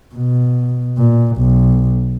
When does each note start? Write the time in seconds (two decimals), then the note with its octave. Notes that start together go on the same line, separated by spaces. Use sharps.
0.15 B2
0.98 A#2
1.37 B1